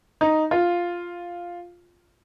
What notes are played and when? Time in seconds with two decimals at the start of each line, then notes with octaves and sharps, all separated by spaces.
0.21 D#4
0.51 F4